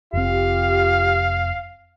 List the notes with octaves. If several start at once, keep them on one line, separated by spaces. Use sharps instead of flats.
F1 C4 F4 G4 F5